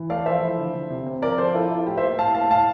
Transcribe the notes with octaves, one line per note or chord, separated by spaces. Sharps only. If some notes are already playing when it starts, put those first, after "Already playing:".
Already playing: E3
A3 D5 F5
F3 C5 E5
E4
D3
D3
C3
C4
F3 A#4 D5
F3 A4 C5
E4 F4 A4
E4
A2 G4
C5 E5
A#3
A2 F5 A5
A2 F5 A5
A2 F5 A5